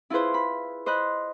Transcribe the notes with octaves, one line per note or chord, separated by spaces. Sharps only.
E4 F4 G#4 B4 C5
B5
C5 D#5 B5 F#6